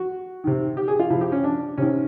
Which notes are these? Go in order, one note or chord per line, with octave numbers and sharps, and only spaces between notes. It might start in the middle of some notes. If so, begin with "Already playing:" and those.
Already playing: F#4
C3 D#3
G4
G#4
F4
C3 F3 E4
G4
C#4
D4
C3 D#3 C#4